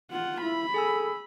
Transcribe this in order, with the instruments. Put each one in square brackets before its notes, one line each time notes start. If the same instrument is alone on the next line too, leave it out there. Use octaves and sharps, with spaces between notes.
[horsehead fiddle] F4 F#5
[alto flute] E4 [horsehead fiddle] B5
[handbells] G#4 G#5 E6 [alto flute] A4